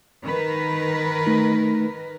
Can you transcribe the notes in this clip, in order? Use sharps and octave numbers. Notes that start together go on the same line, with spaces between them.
D#3 A#4 B4
A3 D#4